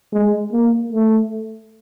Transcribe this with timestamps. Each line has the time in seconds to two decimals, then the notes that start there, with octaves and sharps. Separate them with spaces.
0.12 G#3
0.52 A#3
0.93 A3